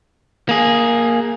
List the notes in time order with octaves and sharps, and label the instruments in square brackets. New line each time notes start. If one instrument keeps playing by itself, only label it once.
[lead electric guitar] A#3 G#4